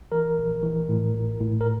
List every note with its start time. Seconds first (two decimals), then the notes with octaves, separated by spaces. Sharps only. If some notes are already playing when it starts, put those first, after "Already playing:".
Already playing: A#1
0.12 E3 A#4
0.38 A#1
0.63 E3
0.89 A2
1.14 A1
1.40 A2
1.61 A#4